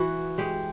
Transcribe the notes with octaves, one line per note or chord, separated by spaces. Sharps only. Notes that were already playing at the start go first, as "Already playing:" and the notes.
Already playing: E3 F#4
G#3 G4